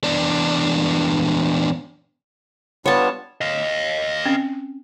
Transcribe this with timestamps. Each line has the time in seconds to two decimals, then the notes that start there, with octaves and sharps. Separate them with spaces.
0.04 E2 D4
2.86 G3 B3 D4 F4 C#5 A5
3.41 D#5 F5
4.26 C4 C#4